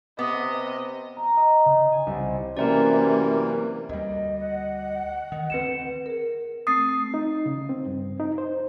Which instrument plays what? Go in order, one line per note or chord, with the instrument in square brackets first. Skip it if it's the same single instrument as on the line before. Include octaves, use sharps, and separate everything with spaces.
[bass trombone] C3 [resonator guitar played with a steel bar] B3 [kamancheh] D#5 [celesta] D6 D#6
[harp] A#5
D#5
C#3
G#5
C2
[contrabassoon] F#2 [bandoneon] C3 E3 [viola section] A#3 [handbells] A#4 C5 D5
[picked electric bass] D2 G3 [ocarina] D#5
[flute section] F#5
[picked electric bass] D#3
[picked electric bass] D2 F#3 C4 [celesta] B4 C#7 E7
[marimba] G#4 A#4
[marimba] A3 C4 A6 [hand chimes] D#6 C7
[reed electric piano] D#4
C#3
C4
G2
D#4
C5